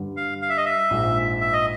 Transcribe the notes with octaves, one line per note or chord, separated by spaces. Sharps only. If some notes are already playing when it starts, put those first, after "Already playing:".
Already playing: G2 D3 G3
F5
F5
E5
D#5
E5
A#1 G#2 F3 G#3
E5
D#5